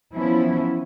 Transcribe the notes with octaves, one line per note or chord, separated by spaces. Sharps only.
E3 F3 B3 C#4 E4